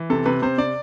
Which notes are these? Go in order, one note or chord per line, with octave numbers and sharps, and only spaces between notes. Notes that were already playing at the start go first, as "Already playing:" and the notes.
Already playing: E3
C3 A4
C3 B4
C3 C5
C3 D5